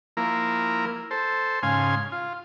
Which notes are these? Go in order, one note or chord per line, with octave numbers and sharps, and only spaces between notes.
F3 A#3 E4 A#4
A4 C5
G#2 C#3 F5 G#5 C6
F4